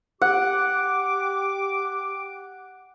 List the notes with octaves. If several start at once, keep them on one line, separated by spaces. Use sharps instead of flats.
G4 F#5 D6